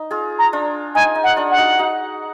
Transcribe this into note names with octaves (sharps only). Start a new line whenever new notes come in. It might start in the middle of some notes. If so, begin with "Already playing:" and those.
Already playing: D#4
F4 G#4
A#5
D4 F4
D#4 G#5
D#4
F#5
D4 F4
F#5
D#4 F#4
D#4 F#4